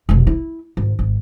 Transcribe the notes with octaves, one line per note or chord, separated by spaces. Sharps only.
F1 B1
E4
G#1
G#1